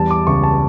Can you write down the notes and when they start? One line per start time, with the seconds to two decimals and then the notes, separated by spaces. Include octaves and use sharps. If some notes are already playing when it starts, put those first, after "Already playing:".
Already playing: E2 G3 A5
0.11 D6
0.27 C#2 C#6
0.43 A5